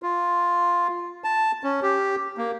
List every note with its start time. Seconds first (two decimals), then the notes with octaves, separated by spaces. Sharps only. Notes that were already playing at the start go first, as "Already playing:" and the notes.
0.03 F4
1.24 A5
1.64 C#4
1.83 G4
2.38 A#3